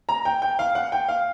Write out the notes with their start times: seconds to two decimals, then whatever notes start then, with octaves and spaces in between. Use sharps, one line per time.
0.09 A#5
0.25 G5
0.42 G5
0.59 F5
0.75 F#5
0.92 G5
1.09 F5